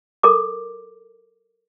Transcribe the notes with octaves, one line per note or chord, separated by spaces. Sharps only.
A4 A#4 D6